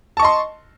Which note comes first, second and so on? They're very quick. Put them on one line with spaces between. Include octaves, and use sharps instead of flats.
A5 C#6 D#5 C6